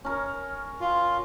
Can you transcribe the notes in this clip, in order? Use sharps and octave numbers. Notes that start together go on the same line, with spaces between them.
C#4 A#4
F4